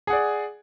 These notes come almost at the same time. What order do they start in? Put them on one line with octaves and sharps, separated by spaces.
G#4 F#5 D5